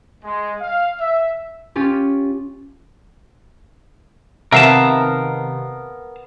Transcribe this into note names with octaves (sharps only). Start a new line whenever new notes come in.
G#3
F5
E5
C#4 F4 G4
C3 D#3 B3 A#4 E5 F5 A5